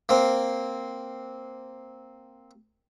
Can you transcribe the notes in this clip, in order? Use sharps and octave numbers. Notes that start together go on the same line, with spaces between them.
A#3 C4